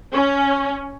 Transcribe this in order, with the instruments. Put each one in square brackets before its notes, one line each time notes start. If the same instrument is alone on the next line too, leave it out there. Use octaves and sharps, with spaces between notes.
[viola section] C#4